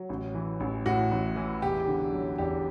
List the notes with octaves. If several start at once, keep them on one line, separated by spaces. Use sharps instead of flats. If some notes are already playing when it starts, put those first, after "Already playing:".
Already playing: F#3
A1
E3
A1
A2 F#4
A1
E3
E1 G4
D3
F#3
E2 G4